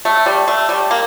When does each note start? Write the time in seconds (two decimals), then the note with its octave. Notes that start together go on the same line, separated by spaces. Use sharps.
0.05 A3
0.26 G3
0.48 A3
0.69 G3
0.91 A#3